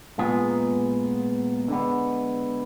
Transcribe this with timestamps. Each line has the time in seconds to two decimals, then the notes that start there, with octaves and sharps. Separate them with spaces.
0.18 A#2 G#3 B3 F4 G#4
1.68 D3 G#3 B3